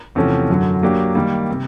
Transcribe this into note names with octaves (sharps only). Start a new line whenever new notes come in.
E2 C3 F3 A3 C#4
F#2 D3 F#3
F#3 A#3 D4 G4
D#3 G3 A#3
C3